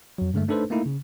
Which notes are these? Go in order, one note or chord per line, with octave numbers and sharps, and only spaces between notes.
F2 F#3
G2 D3 G#3 A3
A3 D4 D#4 A4 B4 C5
A3 A#3 D#4 E4
C#3